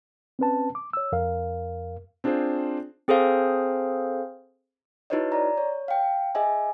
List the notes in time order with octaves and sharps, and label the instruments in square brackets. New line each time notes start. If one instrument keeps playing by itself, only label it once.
[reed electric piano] C4 C#4 B4 A5
D6
C#5 E6
F2 A#4 F5
[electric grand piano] C4 D4 F4 G#4 C5
[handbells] C4 G#4 A4 C5 F5
[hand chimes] D#4 E4 F#4 B4 C#5 D#5
D5 A#5
C#5
F5 G5
G#4 D#5 E5 G#5